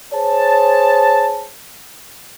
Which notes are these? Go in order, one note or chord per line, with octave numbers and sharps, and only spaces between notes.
G#4 C5 C#5 A5